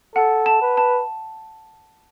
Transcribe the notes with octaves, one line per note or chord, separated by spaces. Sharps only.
A4 F#5
A5
B4
A5